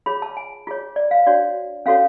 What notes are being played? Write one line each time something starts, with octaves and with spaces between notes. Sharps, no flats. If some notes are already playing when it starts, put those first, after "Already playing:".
F4 G#4 C#5 B5
A5
G#5
F4 G#4 C#5
D5
F5
D4 F#4 C#5 D5
C#4 F#4 A4 C#5 F5